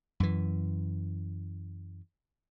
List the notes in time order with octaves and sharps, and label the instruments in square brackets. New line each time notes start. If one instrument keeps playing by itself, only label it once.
[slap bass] F#2 E3